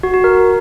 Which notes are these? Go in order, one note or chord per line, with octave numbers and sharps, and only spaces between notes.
F#4
F#4
A#4